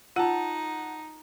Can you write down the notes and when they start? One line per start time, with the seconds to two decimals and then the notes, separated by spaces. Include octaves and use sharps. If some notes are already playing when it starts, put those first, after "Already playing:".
0.16 D#4 F4 F#5 A5